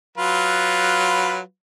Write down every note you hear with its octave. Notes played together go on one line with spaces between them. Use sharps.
F#3 F4 B4